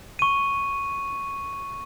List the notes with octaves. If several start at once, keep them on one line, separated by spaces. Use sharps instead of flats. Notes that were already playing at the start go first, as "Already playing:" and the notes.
C#6 D#7